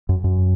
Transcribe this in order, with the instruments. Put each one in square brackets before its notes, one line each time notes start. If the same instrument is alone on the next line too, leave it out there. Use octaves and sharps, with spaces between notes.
[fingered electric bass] F#2
F#2